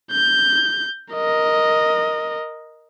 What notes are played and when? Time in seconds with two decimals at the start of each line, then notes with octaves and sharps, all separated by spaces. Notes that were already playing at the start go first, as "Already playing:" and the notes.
0.12 G6
1.14 A#4 D#5